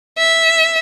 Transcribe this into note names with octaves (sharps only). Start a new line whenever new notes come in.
E5